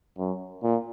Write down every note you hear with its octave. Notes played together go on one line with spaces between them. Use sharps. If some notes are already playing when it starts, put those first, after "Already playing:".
F#2
A#2